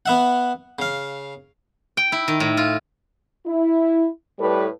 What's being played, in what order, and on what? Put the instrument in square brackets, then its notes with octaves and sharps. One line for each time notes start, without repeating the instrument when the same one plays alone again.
[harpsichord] B3 E5 F#5
C#3 F5
[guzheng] G5
E4
D#3
A2
F4
[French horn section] E4
A2 G3 A4 B4